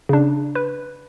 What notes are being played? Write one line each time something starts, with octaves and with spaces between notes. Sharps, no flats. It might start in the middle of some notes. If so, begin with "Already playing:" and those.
C#3 D4
B4